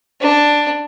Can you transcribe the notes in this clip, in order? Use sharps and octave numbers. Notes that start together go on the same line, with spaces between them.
D4